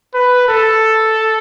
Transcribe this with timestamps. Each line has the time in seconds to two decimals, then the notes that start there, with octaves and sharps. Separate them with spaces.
0.14 B4
0.48 A4